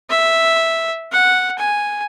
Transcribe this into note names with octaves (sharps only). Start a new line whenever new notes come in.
E5
F#5
G#5